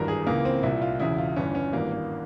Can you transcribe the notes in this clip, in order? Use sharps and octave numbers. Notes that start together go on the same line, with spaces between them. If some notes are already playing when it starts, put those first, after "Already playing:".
Already playing: G#1 G2 E3 A#4
G#4
C#2 C#3 E3 A#3
C4
C2 A#2 E4
F4
E1 E2 C#3 E4
F4
G1 G2 E3 C#4
C#4
G#1 G2 E3 A#3
A#3